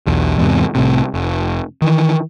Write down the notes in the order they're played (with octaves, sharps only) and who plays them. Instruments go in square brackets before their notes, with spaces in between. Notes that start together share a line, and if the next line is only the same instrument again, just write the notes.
[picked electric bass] B1 E2
E2 G#2 C3
C2 A2 C3
F1
D#3 E3